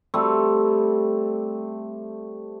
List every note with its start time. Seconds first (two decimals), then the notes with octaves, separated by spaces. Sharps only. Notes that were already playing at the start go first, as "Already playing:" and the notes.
0.14 G3 A3 C4